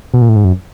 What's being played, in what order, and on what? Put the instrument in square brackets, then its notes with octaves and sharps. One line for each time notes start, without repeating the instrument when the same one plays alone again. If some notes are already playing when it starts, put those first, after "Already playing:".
[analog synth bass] B2
A#2
A2
G#2
F#2